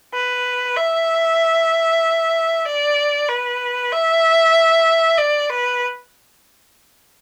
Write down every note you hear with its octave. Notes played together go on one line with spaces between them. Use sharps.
B4
E5
D5
B4
E5
D5
B4